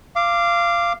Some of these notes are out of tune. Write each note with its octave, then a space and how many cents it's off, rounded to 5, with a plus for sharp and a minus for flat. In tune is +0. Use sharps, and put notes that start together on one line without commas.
F5 -20 D6 +0